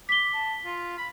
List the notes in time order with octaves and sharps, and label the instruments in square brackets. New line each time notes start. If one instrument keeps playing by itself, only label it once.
[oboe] D6 [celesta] B6 G7
[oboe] A5
F4
B5